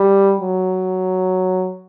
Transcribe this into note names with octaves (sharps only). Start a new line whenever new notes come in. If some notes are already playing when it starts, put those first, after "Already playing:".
Already playing: G3
F#3